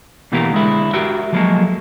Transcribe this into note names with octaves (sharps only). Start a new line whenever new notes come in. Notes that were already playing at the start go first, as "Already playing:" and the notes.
B2 E3 A3 A#3 G4 A#4
D3 G#3 E4
F#4 G4 A#4 E5
F3 F#3 G#3 A#3 A4